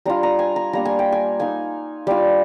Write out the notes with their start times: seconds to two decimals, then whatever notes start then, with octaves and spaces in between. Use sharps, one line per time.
0.05 G3 D4 F4 A#5
0.23 A#5
0.39 G#5
0.56 A#5
0.73 G3 A#3 D4 A#5
0.85 G#5
0.99 G5
1.12 G#5
1.40 A#3 D#4 G#5
2.07 G3 D4 F4 F5